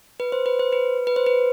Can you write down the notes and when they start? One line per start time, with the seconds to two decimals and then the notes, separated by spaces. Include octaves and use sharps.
0.20 B4
0.32 C5
0.46 B4
0.60 C5
0.73 B4
1.07 B4
1.16 C5
1.26 B4